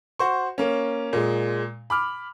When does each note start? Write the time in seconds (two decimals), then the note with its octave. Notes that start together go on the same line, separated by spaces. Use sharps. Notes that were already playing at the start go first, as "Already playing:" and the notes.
0.19 F#4 C5 C#6
0.58 A#3 C#4
1.13 A#2 G#3
1.90 B5 D6 F6